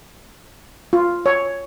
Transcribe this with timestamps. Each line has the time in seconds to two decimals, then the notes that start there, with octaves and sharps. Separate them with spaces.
0.93 F4
1.26 C#5